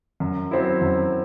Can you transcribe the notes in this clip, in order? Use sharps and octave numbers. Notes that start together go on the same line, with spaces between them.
F#2
F#3 C4 E4
F#2